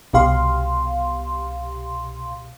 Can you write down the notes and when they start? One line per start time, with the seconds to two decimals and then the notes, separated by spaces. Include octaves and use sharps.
0.13 C2 B2 G4 F5 C6